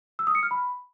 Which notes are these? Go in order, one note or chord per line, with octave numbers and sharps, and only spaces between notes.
E6
D#6
C#7
F6
B5